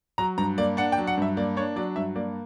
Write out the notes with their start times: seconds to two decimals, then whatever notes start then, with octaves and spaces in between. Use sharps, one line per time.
0.18 F#3 A#5
0.38 G2 A#5
0.58 A#3 D5
0.77 D4 F#5
0.92 G5
0.98 F#3
1.07 F#5
1.18 G2 E5
1.37 A#3 D5
1.57 D4 C#5
1.76 F#3 D5
1.96 G2 E5
2.15 A#3 D5